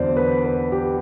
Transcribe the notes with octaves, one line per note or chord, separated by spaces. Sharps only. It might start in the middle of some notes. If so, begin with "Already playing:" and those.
Already playing: E2 D3 F#3 C5 D5
B4
B4
G4